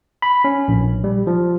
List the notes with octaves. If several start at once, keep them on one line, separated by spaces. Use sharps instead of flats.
B5
C#4
A#1
G3
F3